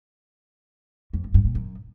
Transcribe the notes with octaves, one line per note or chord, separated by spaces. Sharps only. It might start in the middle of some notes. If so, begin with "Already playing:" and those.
F2
G2
G2
A#2
F#2